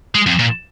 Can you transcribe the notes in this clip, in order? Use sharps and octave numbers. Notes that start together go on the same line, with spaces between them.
G#3
F2
A#2